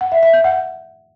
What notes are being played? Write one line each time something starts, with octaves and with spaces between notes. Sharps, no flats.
F#5
E5
E5
G6
F#5